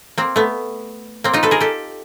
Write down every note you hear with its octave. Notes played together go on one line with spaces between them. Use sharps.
A#3 C4
A3 B3
A#3 C4
D#4 F4
A4 B4
G#4 A#4
G4 A4